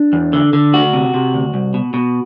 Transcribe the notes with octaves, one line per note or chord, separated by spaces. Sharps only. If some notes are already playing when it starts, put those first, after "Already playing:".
Already playing: D4
E2
D3
D3
D2 F#4
C3
C3
D2
C2
B2
B2